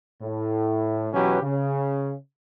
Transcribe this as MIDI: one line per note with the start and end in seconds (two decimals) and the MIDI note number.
0.22 1.09 45
1.14 1.42 47
1.14 1.42 52
1.14 1.42 54
1.14 1.42 61
1.14 1.42 67
1.14 1.42 71
1.43 2.15 49